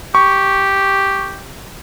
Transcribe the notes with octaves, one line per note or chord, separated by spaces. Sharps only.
G4 C#6